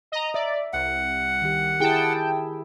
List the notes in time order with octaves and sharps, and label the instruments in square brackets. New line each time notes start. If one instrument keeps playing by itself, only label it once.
[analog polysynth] D#5 A#5
[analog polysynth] D5 [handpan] E5
[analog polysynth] C2 [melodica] F#5
[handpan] D#3 G4
[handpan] E4 G4 G#4 [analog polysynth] G5 A5